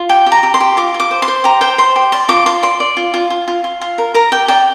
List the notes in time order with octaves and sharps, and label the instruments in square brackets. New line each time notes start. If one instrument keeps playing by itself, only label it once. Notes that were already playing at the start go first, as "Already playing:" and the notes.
Already playing: [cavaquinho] F4
G4 G5
G4
A#5
G4
C6
G4
F4 D6
F4
D6
C5
C6
C5
G4 A#5
C5 G5
C5 C6
G4
D5 C6
F4 D6
F4 C6
D5 C6
D5
F4
F4
F4
F4
F4
F4
A#4
A#4 A#5
G4 G5
D5 G5